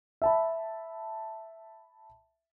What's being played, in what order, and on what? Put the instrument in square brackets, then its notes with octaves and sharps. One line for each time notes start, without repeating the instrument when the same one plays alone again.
[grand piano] E5 A5 B5